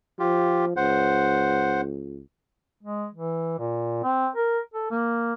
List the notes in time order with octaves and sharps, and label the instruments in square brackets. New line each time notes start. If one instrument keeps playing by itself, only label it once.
[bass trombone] F3 [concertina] F4 G4
[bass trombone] C#2 [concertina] C5 F#5
[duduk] G#3
E3
A#2
C4
A#4
A4
A#3